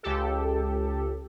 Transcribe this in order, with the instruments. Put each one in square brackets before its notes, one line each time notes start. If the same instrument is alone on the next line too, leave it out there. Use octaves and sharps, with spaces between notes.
[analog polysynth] C#2 G4 A4